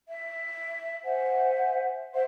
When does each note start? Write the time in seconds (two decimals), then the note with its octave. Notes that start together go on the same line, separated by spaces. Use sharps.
0.08 E5
1.04 C5 E5 F#5 G#5
2.13 C5 E5 F#5 C6